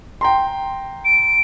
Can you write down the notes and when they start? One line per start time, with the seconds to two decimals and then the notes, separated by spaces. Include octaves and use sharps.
0.21 G5 A#5 C6
1.05 D7